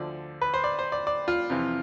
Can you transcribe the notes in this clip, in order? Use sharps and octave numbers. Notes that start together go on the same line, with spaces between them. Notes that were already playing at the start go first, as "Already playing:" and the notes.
Already playing: D2 D3 F3 D5
B4
C5
D5
C5
D5
D5
F4
F2 C3 E3